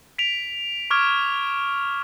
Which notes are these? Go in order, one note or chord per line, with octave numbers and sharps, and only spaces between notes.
B6 D7 F7
C#6 D6 F6 G#6 D7